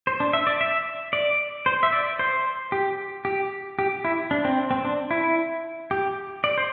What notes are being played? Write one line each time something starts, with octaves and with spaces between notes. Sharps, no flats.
C5
D4
E5
D5
E5
D5
C5
E5
D5
C5
G4
G4
G4
E4
D4
C4
C4
D4
E4
G4
D5
C5